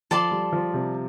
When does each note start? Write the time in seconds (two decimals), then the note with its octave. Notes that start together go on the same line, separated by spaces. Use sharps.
0.11 F3 A4 D5 A5 C6
0.32 G3
0.53 F3
0.74 C3